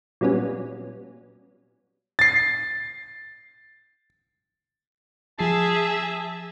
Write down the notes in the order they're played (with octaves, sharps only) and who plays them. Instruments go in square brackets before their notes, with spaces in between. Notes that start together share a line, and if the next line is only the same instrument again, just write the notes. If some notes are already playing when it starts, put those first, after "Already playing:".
[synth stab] A#2 F#3 G3 B3 C#4
[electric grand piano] A6 C7
[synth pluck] F3 C7 [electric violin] G#4 E5 [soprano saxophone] A5